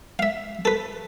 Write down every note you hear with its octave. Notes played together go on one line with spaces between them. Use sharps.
E5 F5
A4 B4